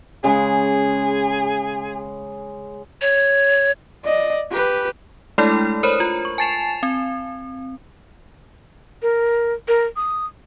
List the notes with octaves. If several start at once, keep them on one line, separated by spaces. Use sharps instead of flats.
C#3 G#3 G#4
C#5
D5 D#5
G4 B4
G#3 A3 D4 E4 A4 D5
A#4 C5 C#5 B5
F4
C#6
G#5 A5 A6 C7 E7 F7
C4
A#4
A#4
D#6